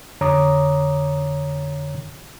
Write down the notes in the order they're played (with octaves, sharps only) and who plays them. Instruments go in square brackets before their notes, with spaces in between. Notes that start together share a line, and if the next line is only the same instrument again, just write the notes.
[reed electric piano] F2 D3 C#5 A#5 D6 D#6